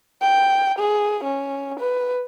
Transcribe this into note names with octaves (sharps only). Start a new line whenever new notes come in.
G5
G#4
C#4
B4